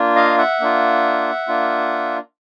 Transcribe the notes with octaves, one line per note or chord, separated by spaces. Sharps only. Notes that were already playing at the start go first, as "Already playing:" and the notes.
Already playing: A#3 D4 F4
D#5 F5
E5 F#5
A#3 D4 F4
A#3 D4 F4